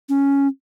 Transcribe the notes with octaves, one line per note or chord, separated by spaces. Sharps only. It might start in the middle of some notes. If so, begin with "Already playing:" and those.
C#4